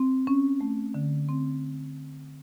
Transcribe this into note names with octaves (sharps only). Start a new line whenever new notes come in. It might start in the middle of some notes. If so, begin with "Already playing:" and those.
Already playing: C4
C#4
A3
D3
C4